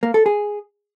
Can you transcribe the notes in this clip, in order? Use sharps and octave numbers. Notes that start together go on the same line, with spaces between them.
A#3
A4
G#4